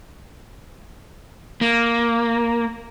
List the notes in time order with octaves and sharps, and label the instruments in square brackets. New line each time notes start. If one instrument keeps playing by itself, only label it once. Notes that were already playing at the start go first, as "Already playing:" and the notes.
[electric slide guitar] A#3